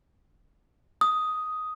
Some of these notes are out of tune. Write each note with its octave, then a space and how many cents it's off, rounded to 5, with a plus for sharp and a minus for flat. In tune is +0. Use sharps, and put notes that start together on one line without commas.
D#6 +5